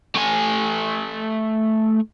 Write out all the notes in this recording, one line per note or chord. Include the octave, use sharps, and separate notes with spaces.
A3 G#5